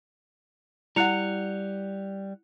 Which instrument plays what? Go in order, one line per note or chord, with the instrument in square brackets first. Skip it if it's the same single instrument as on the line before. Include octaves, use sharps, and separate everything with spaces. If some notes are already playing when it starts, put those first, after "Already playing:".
[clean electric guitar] G3 [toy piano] E4 F#5 [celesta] F#6 C#7 F7